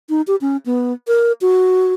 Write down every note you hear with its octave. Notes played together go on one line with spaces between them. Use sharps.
D#4
G4
C#4
B3
A#4
F#4